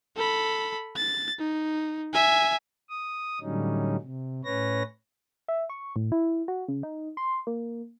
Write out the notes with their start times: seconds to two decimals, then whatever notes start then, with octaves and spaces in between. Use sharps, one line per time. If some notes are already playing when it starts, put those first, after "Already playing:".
0.16 A4 B5
0.97 A6
1.39 D#4
2.14 E5 G#5
2.89 D#6
3.41 A2 D3 F#3 G3 C#4 D#4
4.01 C3
4.44 A2 C#4 B4 C#5 A#6
5.48 E5
5.70 C#6
5.96 A2
6.12 E4
6.48 F#4
6.69 C#3
6.83 D#4
7.17 C6
7.47 A#3